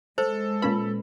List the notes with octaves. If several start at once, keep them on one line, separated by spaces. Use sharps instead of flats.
G#3 A4 C5
A#2 C#4 B4 B5